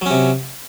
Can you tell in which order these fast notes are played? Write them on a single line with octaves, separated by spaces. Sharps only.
F#3 C#4 C3